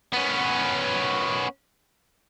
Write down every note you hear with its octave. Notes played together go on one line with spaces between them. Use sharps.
B3 C#4